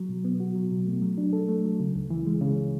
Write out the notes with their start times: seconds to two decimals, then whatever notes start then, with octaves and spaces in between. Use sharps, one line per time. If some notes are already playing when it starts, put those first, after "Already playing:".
Already playing: F#3
0.09 B2
0.25 B3
0.40 F#4
0.55 F#3
0.71 B2
0.87 A3
1.02 F#3
1.18 D4
1.33 A4
1.49 A3
1.65 F#3
1.80 C#3
1.95 C#2
2.10 E3
2.26 G#3
2.41 C#3